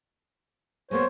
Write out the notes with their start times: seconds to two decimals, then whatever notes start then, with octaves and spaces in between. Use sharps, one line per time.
0.91 G#3 A#3 B3 C5 C#5